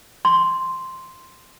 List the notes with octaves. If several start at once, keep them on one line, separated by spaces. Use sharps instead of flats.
C6